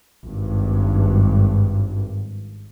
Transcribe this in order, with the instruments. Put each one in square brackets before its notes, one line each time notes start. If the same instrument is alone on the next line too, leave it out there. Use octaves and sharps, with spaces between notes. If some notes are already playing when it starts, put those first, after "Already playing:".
[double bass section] G#1 G2